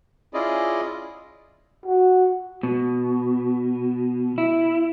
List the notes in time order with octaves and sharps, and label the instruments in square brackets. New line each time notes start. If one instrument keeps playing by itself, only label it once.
[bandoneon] C#4 E4 F4 G#4 D5 D#5
[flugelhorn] F#4
[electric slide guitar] B2
E4